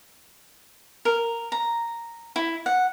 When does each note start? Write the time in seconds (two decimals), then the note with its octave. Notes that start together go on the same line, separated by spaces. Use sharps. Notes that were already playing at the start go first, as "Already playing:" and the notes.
1.05 A#4
1.52 A#5
2.36 E4
2.66 F#5